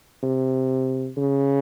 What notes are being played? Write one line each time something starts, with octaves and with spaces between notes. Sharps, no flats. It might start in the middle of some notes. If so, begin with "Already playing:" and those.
C3
C#3